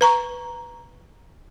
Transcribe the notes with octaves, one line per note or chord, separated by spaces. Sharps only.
B4 A#5 C#6